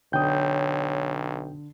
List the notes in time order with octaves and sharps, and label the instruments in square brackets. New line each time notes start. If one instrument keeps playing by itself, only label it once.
[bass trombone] B1 [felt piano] D3 D#6 [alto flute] C#5 [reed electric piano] G5 G6